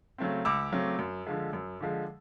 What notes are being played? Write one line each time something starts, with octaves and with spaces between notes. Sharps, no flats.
C#3 F#3 A3 C4
C#2 D6 E6
C#3 F#3 A3 C4
F#2
D3 F3 G#3
F#2
D3 F3 G#3